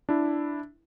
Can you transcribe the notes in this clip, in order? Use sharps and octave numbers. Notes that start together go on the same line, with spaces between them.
D4 E4